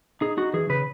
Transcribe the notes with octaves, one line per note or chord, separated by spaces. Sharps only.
D#4 G#4
D#4 F#4
E3 G#4
C#3 B4